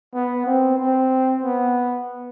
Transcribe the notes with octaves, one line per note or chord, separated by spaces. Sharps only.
B3
C4
C4
B3